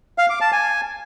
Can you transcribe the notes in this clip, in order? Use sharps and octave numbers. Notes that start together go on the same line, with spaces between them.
F5
D6
A5
G#5